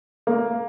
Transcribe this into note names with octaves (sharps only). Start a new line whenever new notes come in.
A#3